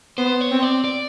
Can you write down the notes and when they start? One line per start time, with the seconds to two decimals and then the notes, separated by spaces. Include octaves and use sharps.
0.18 B3 C5
0.41 C#5
0.51 C4
0.63 D5
0.84 D5